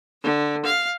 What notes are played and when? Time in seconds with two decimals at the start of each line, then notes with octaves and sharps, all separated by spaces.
0.23 D3
0.65 F5